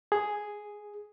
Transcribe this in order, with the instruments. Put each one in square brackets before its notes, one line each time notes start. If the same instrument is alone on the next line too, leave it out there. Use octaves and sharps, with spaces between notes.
[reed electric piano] G#4